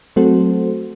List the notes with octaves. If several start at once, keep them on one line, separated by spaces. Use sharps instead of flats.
F#3 A3 C4 F#4 A4 C5